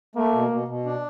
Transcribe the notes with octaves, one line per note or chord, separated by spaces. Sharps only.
A3 A#3
B2
B2
B2
D4